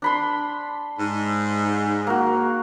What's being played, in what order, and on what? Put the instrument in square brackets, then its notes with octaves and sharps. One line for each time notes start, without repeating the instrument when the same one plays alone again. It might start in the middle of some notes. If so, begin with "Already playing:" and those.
[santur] D4 B5 C6
[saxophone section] G#2
[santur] A#3 F#4